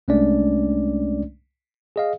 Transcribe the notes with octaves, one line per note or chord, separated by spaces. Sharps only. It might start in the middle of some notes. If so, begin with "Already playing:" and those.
C2 G#3 A3 C#4 D4 D5
G#4 D#5 F5